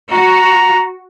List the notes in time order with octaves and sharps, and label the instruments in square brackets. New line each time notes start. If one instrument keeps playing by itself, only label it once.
[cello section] F#4 [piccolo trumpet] A#5